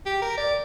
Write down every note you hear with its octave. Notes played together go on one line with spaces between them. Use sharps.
G4
A#4
D5